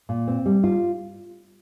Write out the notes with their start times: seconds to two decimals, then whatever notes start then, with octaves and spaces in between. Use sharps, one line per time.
0.09 A#2
0.28 C4
0.46 G3
0.64 F4